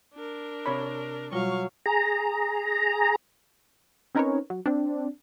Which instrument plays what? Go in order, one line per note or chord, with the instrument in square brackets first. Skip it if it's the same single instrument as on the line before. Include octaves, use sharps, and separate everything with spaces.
[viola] D4 A#4
[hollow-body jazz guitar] C3 C#5 B5
[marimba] B2 G3 F4 [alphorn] F#3 [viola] F5 C#6
[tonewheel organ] G#4 A#5
[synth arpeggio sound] C4 C#4 D#4 A#4 B4 C#5
F#3
C4 D4